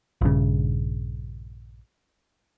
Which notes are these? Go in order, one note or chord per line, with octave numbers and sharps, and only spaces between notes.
A#1 G2 C#3